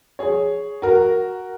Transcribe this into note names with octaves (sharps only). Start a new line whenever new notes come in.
G#4 C#5
F#4 A#4